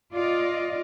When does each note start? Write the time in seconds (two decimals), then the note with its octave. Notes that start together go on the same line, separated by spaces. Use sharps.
0.14 F4 D5 D#5